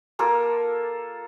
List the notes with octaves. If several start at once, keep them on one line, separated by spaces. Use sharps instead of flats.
A#3 F4 A4 A#4